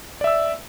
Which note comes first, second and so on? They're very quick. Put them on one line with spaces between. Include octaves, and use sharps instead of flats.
D5 E5 E6